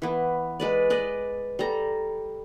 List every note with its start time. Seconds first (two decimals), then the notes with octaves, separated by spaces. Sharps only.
0.02 E3 B3
0.60 G#3 B4 D5
0.90 B4 D5 D#5
1.59 G3 A4 A#5